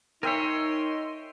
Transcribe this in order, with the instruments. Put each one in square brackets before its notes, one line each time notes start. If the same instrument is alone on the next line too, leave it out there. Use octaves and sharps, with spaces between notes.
[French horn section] D#4 [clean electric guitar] A#4 C#5 [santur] E5 G5 G#5 [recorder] C6